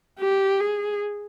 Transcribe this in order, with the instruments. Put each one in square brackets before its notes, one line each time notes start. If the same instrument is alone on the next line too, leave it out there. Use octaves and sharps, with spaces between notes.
[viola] G4
G#4